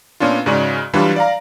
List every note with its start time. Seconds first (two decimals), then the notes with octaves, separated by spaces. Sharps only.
0.20 A#2 B3 C#4 D4 F4
0.46 G#2 C#3 G#3 C#4 F#4 D5
0.93 E3 F#3 G3 D4 F4 B4
1.16 D5 F5 A#5